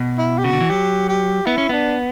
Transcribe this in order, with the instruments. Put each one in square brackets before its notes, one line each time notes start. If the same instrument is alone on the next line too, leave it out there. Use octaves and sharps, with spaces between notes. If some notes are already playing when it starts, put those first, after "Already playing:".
Already playing: [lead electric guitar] B2
[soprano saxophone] E4
G4
[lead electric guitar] C#3 [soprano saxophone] F#4
[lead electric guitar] D3
E3
[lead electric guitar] F#3 [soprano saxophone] G4
[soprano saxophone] G4
[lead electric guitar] B3 [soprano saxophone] E4
[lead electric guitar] C#4
[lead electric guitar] B3 [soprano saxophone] D4